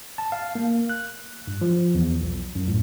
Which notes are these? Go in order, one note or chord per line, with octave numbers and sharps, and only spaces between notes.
A5
F5
A#3
F#6
G2
F3
E2
B1
F#2
A2